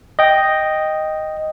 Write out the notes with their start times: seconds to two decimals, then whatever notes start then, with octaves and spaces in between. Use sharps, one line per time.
0.19 D#5 G5